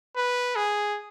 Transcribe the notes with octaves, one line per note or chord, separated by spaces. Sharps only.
B4
G#4